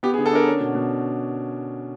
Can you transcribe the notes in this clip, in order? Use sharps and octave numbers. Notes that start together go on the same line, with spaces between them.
B3 G4
G#4
D3
A4
D4 A#4
C#4
B2
B2